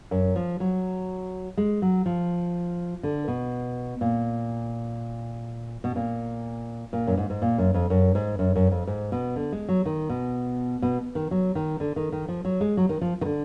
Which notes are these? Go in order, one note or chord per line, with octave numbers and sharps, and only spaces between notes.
F#2
F3
F#3
G#3
F#3
F3
D3
B2
A#2
B2
A#2
A#2
F#2
G#2
G#2
A#2
F#2
F2
F#2
G#2
F#2
F#2
F2
G#2
B2
D3
G#3
F#3
D#3
B2
B2
D#3
F#3
D#3
D3
D#3
D#3
F3
F#3
G#3
F#3
D#3
F3
D#3
D3